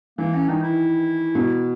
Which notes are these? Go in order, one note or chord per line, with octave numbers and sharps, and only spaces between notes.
E3 A#3
C#4
D#3 D#4
E4
B2